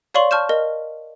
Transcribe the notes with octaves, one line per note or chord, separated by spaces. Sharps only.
C#5 D5 F5 C6 C#6 F#7
A5 C#6 F6 G6 E7
A#4 D#5